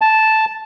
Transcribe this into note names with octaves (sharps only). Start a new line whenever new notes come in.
A5